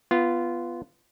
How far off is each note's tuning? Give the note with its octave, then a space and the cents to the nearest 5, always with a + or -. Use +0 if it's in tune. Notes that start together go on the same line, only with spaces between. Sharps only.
B3 +0 F4 -15